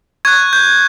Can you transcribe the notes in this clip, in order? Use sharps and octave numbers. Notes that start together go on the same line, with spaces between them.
C#6 F#6 G#6
G6